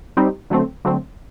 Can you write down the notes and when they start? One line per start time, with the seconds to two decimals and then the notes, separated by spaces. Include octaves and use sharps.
0.17 G3 C4 D#4 G4
0.50 D3 F#3 A3 C4
0.85 D3 F#3 A3 C4